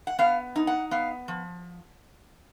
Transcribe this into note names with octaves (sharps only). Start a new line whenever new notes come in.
F#5
B3 F5
D#4
F#5
B3 F5
F3